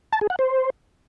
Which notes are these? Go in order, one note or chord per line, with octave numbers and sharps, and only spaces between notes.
A5
G#4
F#5
C5